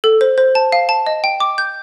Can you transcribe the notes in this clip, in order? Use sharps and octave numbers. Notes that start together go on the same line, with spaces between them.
A4
C5
C5
A5
F5
A5
D#5
G5
D6
G6